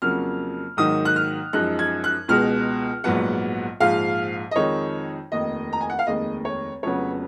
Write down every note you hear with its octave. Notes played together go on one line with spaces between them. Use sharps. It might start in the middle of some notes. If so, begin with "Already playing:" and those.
F2 C#3 F#3 A#3 F6
G#2 D#3 F#3 A#3 D#4 D#6
F#6
F6
F#2 F3 G#3 D#4 F#6
G#6
F#6
C#2 B2 G#3 F6
A#1 G#2 F#3 B3 F#5
A#1 G#2 F3 G#3 F5
D#5
F2 D#3 G#3 D#4 C#5
F1 D#2 D#3 D#5
A#5
G#5
F#5
F5
F1 D#2 D#3 G#3 D#5
C#5
F1 F2 C#3 F#3 B3 C#5